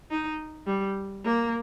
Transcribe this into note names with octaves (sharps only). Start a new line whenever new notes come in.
D#4
G3
A#3